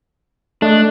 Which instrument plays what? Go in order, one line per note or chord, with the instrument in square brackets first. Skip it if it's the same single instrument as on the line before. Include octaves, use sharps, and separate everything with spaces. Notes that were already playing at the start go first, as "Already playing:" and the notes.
[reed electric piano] A3 D#5 F#6 [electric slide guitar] D4